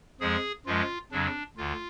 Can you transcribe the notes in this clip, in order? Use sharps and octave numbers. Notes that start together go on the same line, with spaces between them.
F2 F3 G#3 G#4
F#2 F3 G#3 F4
F2 C#3 F#3 D4
D2 D3 F4